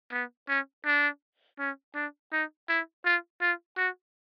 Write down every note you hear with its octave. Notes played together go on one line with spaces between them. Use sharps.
B3
C#4
D4
C#4
D4
D#4
E4
F4
F4
F#4